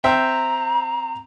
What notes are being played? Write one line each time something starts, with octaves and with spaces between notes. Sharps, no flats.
C4 E5 G5 A#5